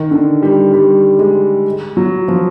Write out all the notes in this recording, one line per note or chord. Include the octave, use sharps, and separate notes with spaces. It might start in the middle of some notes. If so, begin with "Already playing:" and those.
Already playing: D#3
D3
G3
G3
G#3
F#3
F3